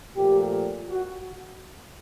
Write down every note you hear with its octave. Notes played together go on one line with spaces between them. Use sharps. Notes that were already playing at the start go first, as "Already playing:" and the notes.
A#2 F3 A3 G4
F#4